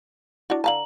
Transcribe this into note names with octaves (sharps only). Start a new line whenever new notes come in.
D4 E4 F#4
D3 F5 A5 A#5 F#7